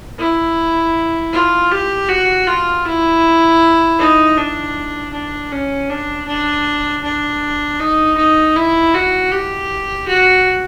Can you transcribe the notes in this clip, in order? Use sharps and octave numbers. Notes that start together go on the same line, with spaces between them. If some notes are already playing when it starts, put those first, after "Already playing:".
E4
F4
G4
F#4
F4
E4
D#4
D4
D4
C#4
D4
D4
D4
D#4
D#4
E4
F#4
G4
F#4